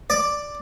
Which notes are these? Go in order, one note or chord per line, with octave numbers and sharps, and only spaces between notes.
D5